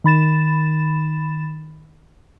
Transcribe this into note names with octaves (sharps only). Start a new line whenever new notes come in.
D#3 B5 A6 E7